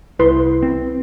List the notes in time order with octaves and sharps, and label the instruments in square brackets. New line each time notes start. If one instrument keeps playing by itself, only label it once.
[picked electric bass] C2 [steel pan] E4 B4 C6
[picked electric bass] C4